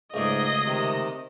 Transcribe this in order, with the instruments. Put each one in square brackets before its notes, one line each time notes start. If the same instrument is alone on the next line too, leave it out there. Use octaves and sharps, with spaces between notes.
[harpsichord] C#2 A3 D5 [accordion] G#2 [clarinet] G#4 [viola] D#5
[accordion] C3 D#3